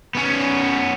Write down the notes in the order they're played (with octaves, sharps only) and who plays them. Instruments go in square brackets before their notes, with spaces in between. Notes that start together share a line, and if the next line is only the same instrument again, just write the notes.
[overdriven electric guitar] B3 C#4